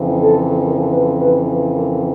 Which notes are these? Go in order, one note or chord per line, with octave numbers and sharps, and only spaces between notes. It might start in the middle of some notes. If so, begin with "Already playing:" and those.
Already playing: F2 C#3 E3
A4
A#4
B4
B4
B4
A#4